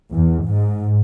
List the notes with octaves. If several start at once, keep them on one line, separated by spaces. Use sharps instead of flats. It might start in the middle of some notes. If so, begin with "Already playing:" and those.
E2
G#2